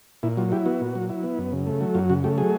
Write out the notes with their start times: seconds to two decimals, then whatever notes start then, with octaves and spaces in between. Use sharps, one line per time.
0.23 A#2 E4
0.37 F#3 F4
0.52 E4 G4
0.66 B3 F#4
0.81 A#2
0.95 F#3
1.09 E4
1.23 B3
1.38 F#2
1.52 C#3
1.67 A3
1.81 F#3
1.95 F#2 F4
2.10 C#3 F#4
2.24 A3 G4
2.38 F#3 G#4